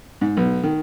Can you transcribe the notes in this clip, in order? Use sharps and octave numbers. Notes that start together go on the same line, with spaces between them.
G#2
B1
D#3